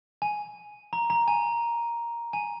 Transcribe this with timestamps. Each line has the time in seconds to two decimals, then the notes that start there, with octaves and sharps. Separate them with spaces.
0.22 G#5
0.93 A#5
1.10 A#5
1.28 G#5
2.33 G#5